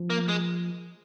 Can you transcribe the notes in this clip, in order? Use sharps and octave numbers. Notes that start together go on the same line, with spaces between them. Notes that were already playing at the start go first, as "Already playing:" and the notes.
Already playing: F3
A#3
G#3